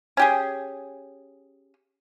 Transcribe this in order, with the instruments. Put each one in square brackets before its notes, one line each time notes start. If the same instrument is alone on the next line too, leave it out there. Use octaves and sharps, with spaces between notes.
[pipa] C#4 G4 G#4